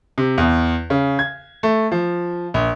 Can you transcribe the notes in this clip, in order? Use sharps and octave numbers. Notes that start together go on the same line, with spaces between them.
C3
E2
C#3
G#6
A3
F3
A#1